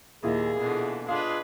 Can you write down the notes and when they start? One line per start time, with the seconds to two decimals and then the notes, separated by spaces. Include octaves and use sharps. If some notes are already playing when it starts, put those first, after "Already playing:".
0.24 D#2 A#2 E4 G#4
0.60 B2 D3 E3
1.08 G#3 D4 F4 G#4 B4 F5